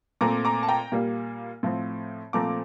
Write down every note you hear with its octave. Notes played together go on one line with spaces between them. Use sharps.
A#2 A3 C4 A#5 D6
A#5 D6
A5
G5 A#5
A#2 G3 A#3
A2 F3 C4
A#2 F3 A3 C4 A#5 D6